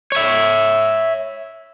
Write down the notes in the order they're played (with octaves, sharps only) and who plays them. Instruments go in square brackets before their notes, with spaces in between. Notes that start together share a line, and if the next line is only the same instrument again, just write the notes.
[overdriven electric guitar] C#5 E5